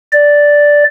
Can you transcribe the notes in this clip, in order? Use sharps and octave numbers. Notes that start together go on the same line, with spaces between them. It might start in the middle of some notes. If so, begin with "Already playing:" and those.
D5